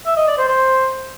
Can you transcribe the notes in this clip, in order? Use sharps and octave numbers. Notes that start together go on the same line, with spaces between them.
E5
D#5
D5
C5
C5